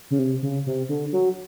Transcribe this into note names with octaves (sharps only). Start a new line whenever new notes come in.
C#3
C3
C#3
C3
D3
F#3